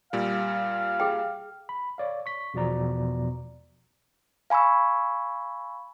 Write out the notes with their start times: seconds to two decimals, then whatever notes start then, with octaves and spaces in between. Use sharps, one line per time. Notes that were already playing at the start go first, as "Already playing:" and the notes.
0.13 A#2 G3 F5
1.00 G#4 G5
1.69 B5
1.98 C#5 D5 F5
2.26 C#6 B6
2.54 E2 B2 F3 D5 A#5
4.50 F5 G#5 B5 C#6 E6